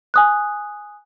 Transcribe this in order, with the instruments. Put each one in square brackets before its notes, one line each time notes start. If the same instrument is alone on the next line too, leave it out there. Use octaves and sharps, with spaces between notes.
[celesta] G#5 D#6 F#6